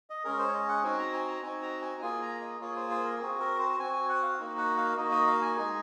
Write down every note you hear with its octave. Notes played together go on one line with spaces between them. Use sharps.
D#5
G#3 C#4 G#4 A#4
C5
C#5
D#5
F#5
C4 D#4 F#4 G#5
A#5
G#5
A#5
C4 D#4 F#4 G#5
A#5
G#5
A#3 F4 G#4 G#5
A#5
D#5
A#3 F4 G#4 C#5
C5
C5
A#4
C4 F#4 G#4
A#4
C5
C4 F#4 G#5
G#5
F#5
F5
A#3 D#4 F#4
F#5
F5
A#3 D#4 F#4 D#5
D#5
F5
G#5
G#3 D#4 G#4 G#5